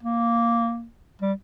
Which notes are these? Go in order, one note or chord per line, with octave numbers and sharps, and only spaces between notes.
A#3
G3